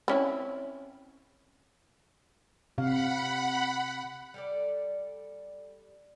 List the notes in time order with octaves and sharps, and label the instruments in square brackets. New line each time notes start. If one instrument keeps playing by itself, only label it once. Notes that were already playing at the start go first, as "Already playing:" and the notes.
[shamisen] C4 C#4 E4
[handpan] C3 F5 [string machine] F#5 B5
[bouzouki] G3 A4 D5